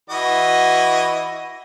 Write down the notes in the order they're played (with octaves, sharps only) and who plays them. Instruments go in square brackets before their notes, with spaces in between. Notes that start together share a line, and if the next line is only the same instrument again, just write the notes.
[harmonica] E3 F#4 D#5